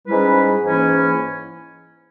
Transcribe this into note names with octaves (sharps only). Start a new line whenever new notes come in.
G#2 G3 C#4 E4 B4
G#2 E3 A#3 C#4 E4